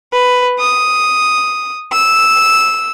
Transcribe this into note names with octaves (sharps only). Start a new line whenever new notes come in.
B4
D#6
E6